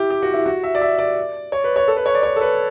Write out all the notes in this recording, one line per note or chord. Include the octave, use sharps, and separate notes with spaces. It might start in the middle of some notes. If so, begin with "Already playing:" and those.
Already playing: E4 G4
G4
F#4
E4
F#4
E5
D5
E5
D5
C#5
B4
C#5
A4
B4
C#5
D5
C#5
A4
B4